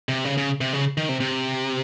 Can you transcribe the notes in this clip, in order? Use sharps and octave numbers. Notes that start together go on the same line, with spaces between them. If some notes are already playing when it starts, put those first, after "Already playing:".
C3
C#3
C#3
C3
C#3
D#3
C3
C3